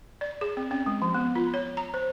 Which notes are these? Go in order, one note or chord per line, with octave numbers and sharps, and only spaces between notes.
D5
G#4
C4
C#4
G#3
F3
B3
F4
C#5
A#5
C5